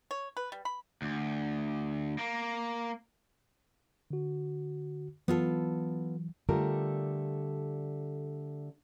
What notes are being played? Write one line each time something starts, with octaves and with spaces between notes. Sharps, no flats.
C#5
B4
G3
B5
D2
A#3
D3 F#4
E3 F#3 B3 F4 A4
D3 G3 A3 F4 A#4